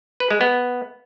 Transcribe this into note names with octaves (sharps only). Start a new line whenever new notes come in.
B4
G#3
B3